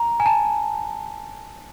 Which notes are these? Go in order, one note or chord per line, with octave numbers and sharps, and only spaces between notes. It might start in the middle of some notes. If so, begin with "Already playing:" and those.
Already playing: A#5
G#5
A5